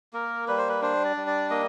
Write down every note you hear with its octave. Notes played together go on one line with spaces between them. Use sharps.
A#3 A#4
G3 B4
C5
B4
D4 C5
D5
G3
D5
A#3 D#5